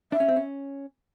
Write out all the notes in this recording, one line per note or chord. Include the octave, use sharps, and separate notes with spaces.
D4 E5
C#4
C4
C#4